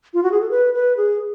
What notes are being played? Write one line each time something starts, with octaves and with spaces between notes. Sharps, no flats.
F4
F#4
G#4
A4
B4
B4
G#4